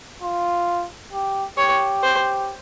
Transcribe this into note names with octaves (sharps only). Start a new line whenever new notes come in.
F4
G4
G4 C#5
C5